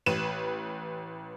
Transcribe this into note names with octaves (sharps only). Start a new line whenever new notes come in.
A1 B4 D#7 E7